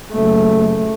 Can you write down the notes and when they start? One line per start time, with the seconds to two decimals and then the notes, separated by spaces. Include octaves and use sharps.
0.13 F#1 A3